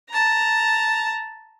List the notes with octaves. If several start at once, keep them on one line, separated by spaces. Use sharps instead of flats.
A5 A#5